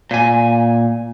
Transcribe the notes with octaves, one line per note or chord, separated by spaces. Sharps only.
A#2 G#5